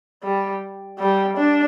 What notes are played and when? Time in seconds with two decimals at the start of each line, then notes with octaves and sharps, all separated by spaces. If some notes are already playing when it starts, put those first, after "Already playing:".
0.23 G3
0.99 G3
1.37 D4